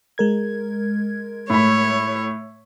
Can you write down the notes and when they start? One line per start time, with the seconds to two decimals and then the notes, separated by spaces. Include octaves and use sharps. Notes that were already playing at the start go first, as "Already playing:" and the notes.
0.18 G#3 A#4 G#6
1.50 A2 C#5 B5